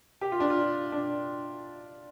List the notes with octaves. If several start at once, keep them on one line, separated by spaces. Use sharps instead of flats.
G4
F4
D4
F4
D4